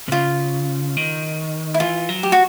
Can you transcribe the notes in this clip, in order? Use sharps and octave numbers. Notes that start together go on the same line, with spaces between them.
C3
C#3 F4
D#3
E4
E3 F4
F#3
G4
F#4